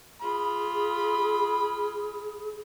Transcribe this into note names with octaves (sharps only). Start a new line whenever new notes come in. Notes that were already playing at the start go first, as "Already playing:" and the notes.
F4 G#4 B5